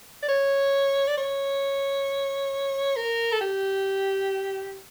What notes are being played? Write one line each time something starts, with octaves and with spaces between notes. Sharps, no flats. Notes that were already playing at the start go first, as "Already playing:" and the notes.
D5
C#5
D5
C#5
A#4
A4
G4